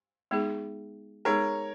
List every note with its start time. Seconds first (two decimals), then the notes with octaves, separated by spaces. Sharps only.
0.31 G#3 B3 D#4 G#4
1.25 G#3 B3 D#4 G#4 A#4 C#5